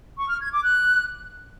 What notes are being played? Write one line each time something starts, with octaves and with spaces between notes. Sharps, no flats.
C#6
F6
G#6
D6
F#6